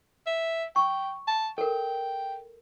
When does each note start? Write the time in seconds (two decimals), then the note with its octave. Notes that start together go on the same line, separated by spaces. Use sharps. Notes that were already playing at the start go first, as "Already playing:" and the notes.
0.27 E5
0.76 G5 C#6
1.27 A5
1.58 A4 A#4 G5